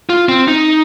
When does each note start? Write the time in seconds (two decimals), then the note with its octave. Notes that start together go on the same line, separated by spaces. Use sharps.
0.09 F4
0.29 C4
0.48 D#4